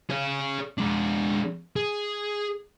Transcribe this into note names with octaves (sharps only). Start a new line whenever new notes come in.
G#4 C#5
G#3 D4
G#4